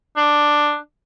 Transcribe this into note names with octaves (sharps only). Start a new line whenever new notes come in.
D4